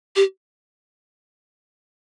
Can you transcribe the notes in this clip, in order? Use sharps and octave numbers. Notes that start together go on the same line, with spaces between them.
G4